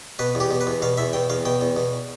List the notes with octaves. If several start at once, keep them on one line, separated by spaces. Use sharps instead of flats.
B2 B4
E2
G4
B2
B4
E2
B2 F5
E2 E5
B2 G5
E2 F5
B2 G5
E2
B2